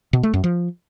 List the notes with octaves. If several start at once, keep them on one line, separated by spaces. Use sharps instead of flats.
B2
A3
F#2
F3